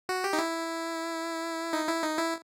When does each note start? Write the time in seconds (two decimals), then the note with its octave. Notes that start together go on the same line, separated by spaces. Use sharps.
0.09 F#4
0.24 G4
0.33 D#4
0.38 E4
1.73 D#4
1.88 E4
2.03 D#4
2.18 E4